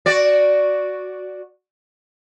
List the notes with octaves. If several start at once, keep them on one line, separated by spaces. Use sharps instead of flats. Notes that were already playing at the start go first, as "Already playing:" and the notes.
F#4 D5